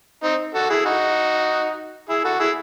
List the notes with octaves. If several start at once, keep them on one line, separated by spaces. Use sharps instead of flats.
C4 D#4
F#4 A4
E4 G#4
D#4 F#4
E4 G#4
F#4 A4
E4 G#4